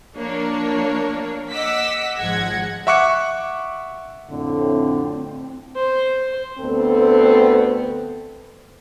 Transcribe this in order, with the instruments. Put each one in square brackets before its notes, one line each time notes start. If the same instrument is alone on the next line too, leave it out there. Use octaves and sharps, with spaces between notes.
[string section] F3 A#3 D4 A#4 C#5
D#5 F#5 D6 E6 B6
G#1 F3 G#3 F#5 G#6 A#6
[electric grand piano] E5 F#5 C#6 D6 F#6 C#7
[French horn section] F2 A2 D3 [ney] C4
[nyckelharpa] C5
[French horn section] D2 B3 C4 A4